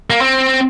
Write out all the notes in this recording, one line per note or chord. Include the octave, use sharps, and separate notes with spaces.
A#3
C4